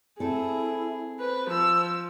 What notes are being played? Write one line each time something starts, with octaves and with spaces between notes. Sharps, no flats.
C4 E4 G#4 A4
B4 C5
F3 E6